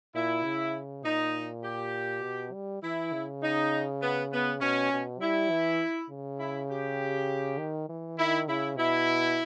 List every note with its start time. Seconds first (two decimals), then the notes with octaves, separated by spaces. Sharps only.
0.15 A#2 E4
0.44 C#3
1.04 A#2 D#4
1.64 G4
2.23 B2
2.53 G3
2.83 E3 E4
3.13 C#3
3.42 D#4
4.02 B3
4.32 B3
4.61 B2 C#4
4.92 B2
5.21 G3 E4
5.51 E3
6.10 C#3
6.40 E4
6.70 G4
7.58 D#3
7.89 E3
8.18 D#3 E4
8.48 C#3 E4
8.77 B2 E4